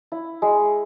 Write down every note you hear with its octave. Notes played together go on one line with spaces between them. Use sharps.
E4
G#3